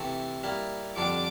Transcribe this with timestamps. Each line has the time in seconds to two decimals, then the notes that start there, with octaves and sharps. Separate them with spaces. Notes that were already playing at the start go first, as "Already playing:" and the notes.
Already playing: C3 E3 A3 C4
0.43 G3 A#3 E4
0.96 F2 D3 G3 D4 D6